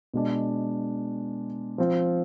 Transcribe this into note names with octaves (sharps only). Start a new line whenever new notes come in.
B2 G#3 D4
F3 C4 F4